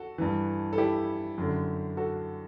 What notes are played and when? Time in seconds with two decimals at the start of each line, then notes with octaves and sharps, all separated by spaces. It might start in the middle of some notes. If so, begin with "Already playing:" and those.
Already playing: F#4 A4
0.18 G2 E3
0.73 A4
0.78 E4 G4
1.38 F#2 D3
1.97 F#4 A4